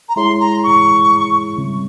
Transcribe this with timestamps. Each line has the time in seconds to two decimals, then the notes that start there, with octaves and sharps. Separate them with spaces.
0.08 A#5
0.16 G#3 E4 G#4 C#5 E5 C6
0.40 A#5
0.63 C#6
1.58 C#3 G3 C4